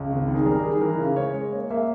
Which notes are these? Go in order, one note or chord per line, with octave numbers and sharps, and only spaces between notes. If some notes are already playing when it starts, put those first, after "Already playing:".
Already playing: C#2
G#1
D#3
G#4
G3 A#4
D#3 G#4
E3 A#4
C#3
G#3 C#5
G#3
A#3 C#5
A#3 E5